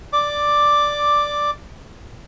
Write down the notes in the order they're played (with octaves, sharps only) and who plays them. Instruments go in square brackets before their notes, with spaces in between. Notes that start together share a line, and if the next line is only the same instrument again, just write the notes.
[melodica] D5 D6